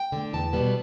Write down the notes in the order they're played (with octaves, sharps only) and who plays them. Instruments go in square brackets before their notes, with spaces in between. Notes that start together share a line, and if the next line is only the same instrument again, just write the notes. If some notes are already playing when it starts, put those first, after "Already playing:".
Already playing: [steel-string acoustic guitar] G5
D3 A3
E2 A5
B2 G3 B3